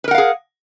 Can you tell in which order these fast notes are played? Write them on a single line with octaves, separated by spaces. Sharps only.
B4 A#4 F#5 F5 G#4